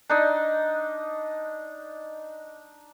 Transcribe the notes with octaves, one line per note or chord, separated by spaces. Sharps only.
D4 D#4 D#5